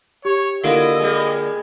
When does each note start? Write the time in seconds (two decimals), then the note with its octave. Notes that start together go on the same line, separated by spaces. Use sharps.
0.25 G4 C#5
0.64 D3 A#3 E4 F4 D#5
0.99 G3 G#3